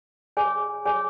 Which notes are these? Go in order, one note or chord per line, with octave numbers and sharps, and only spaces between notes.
G#4 C#5 G#5
G#4 C#5 G#5